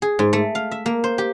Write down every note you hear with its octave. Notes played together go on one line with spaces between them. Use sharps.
G#4
G#2
A3
F5
E5
A#3
C5
G4